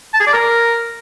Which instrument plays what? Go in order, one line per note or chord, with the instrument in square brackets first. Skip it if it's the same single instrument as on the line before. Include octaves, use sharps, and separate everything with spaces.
[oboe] A5
G#4
D5
A#4